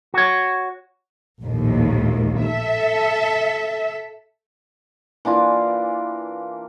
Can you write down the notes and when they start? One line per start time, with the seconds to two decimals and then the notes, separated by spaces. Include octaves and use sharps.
0.14 F#4 C#5
1.43 A#1 D#2 A2
2.45 A4 E5
5.25 E3 A#3 D4 F4